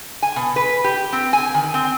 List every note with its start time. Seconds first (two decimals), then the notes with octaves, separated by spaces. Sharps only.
0.22 G#5
0.36 B2
0.56 B4
0.84 G4
1.12 C4
1.33 G#5
1.54 D#3
1.74 C4